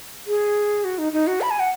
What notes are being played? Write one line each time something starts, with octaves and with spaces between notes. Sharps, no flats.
G#4
F#4
D#4
D#4
F#4
B5
G#5
F#5